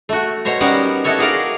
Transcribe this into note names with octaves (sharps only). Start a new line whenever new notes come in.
A3 F#4
B2 C5 C#5 A#5
G3 B3 C#4 D#4 A#4 F#5
D#4 E4 F#4 A4 C#5
F#4 G#4 A#4 D5 D#5 F5